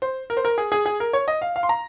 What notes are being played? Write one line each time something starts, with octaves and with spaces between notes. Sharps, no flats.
C5
A#4
C5
A#4
G#4
G#4
G#4
A#4
C#5
D#5
F5
F5
C6
A#5